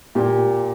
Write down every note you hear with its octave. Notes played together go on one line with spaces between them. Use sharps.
A#2 G4